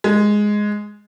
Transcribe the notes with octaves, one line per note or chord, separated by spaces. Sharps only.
G#3